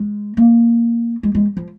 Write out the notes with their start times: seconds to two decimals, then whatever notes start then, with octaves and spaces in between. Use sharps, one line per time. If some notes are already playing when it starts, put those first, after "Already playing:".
Already playing: G#3
0.37 A#3
1.23 G#3
1.35 G#3
1.57 F3